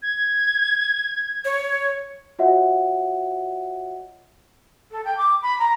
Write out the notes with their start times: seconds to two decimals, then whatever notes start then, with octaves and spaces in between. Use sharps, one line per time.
0.02 G#6
1.45 C#5
2.39 F4 F#4 C#5 D#5 E5 F#5
4.91 A4
5.05 G5
5.17 D6
5.42 B5
5.59 A#5